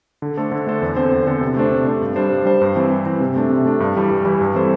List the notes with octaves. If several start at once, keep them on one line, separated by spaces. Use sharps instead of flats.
D3
A3 D4 A4 C5
D3
A3 D4 A4 C5
E2
D3 C4 A4 C5
E2
D3 C4 A4 C5
C3
A3 D4 C5
C3
A3 D4 C5
G2
G3 D4 C5
G2
G3 D4 C5
G2
E3 C4
G2
E3 C4
C3
A3 D4
C3
A3 D4
G2
E3 G3 E4
G2
E3 G3 E4
G2
E3 C4 A4 C5